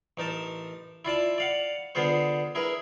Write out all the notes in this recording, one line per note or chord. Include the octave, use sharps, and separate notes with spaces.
A1 D#4 A#4 A5
E4 F4 D5 A5
D5 F5 F#5
D3 B3 F4 G#4 C5
E4 G#4 A#4 B4